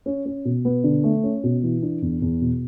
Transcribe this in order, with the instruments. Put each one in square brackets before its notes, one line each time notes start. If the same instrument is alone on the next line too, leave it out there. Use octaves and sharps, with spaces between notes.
[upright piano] C#4
C#4
B2
B3
D3
A3
C#4
B2
E3
D4
E2
E2
B2